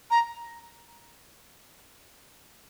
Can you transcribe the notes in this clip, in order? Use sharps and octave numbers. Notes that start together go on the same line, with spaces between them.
A#5